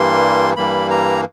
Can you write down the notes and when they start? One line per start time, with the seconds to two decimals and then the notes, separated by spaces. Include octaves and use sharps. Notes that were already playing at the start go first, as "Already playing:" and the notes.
Already playing: G2 E3 G3 A#3 C6
0.57 G2 E3 G3 A#3 B5
0.90 A#5